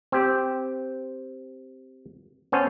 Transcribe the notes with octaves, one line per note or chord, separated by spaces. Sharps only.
C4 G4
B3 C#4 A4 C5